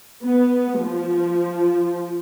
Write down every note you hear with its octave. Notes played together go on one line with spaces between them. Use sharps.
B3
F3